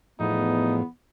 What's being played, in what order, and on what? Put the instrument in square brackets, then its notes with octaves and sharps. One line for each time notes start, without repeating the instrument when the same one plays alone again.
[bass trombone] E2 [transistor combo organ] A2 F3 [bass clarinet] B3 [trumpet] D#4